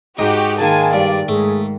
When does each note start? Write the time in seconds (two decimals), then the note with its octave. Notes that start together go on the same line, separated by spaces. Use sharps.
0.19 G#2 D#4 F#4 G4
0.60 D#3 G#3 A#3 F5 G#5 A5
0.93 G2 D5
1.28 G#2 A3 G#4